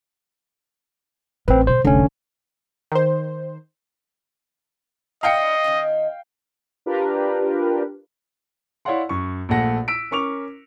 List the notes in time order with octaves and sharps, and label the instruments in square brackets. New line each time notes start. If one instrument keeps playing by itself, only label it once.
[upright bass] A1 C#4 [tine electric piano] C4 B4
[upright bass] B2 E4 [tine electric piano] C5
[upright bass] F1 C2 [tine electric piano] D3 C#4
[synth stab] D#3 C5
[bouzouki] D4 E4 [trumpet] D#5 [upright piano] F5 G5 C#7
[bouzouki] D#3 C#4 D#4
[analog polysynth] D4 F4 G4 A#4 B4
[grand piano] E4 C#5 D5 F5 F#5 C6
F#2 C#6
A#1 A#2 A3 F#5 A#6
E6 B6 D7
C#4 A#4 C#6 D6 F7